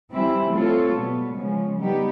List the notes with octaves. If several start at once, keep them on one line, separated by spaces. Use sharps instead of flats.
E3 G3 C4 E4
A3 C4 F4 A4 C#5
B2 G3 B3
C#3 F3 G#3 C#4
G3 B3 D#4 G4